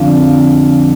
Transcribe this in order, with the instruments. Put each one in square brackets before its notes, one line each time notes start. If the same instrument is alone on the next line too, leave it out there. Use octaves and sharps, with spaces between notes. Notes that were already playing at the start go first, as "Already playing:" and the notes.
Already playing: [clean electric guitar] F2 D3 F3 F5